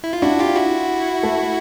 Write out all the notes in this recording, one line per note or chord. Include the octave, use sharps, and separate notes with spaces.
E4
F4
D4 E4 F#4
F4 G4
E4 F#4
A3